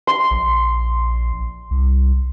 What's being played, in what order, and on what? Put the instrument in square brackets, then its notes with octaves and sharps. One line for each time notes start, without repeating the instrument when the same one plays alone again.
[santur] C6
[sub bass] A#1
C2